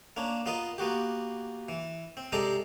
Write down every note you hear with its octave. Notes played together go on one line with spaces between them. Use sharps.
A#3 C#4 D4
B3 F4 A#4 D#5
A#3 B3 F#4 G4
E3
C4
C3 G#3 G4 A4 D5 A#5